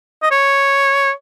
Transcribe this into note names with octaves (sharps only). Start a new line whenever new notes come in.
D#5
C#5